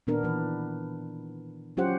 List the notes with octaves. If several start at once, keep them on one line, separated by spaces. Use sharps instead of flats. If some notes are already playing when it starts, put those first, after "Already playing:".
A#2 D#3 B3 D4 A#4
E3 B4
F#3 C#4 F4 G4 C5 F#5